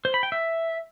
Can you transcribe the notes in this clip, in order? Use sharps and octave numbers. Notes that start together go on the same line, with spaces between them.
C5
B5
G5
E5